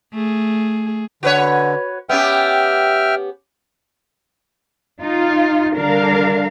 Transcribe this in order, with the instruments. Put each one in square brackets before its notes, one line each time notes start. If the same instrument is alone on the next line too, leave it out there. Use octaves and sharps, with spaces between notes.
[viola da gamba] A3 G#4
[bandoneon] D3 [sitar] F#4 B4 C#5
[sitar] B3 C#4 G4 [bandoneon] E5 G5 F6
[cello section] D#4 F4
D3 G3 D4 A#4 F5